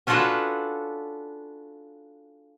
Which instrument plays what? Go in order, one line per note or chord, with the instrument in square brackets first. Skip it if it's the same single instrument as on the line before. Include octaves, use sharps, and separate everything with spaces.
[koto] C#4 D4 F4 F#4 A4 B4